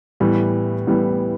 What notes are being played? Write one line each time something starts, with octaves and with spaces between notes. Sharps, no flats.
A2 E3 G3 B3
A2 E3 G3 B3